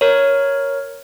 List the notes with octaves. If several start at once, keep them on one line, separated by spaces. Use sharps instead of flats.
A#4 C#5